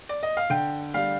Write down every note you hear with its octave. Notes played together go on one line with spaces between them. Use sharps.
D5
D#5
F5
D3 G5
G3 F5